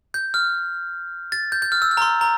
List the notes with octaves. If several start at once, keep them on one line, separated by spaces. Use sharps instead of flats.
G6
F6
A6
G6
G6
F6
E6
F6
A#5
C6
A#5